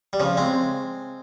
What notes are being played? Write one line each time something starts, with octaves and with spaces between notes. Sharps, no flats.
G3
C#3 F3
G#3 C4